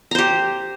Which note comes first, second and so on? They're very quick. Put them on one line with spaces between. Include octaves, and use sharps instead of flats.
A#5 C5 G4